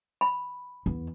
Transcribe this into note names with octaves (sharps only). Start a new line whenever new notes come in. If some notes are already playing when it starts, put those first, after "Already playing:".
B5
E2